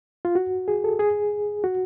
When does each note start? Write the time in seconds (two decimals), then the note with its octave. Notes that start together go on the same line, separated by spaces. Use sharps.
0.25 F4
0.35 F#4
0.68 G#4
0.84 A4
0.99 G#4
1.64 F#4